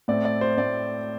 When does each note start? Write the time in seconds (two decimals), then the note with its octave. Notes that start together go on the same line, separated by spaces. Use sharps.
0.08 A2 A3 C4 D5
0.25 D5
0.41 C5
0.57 A2 A3 C4 D5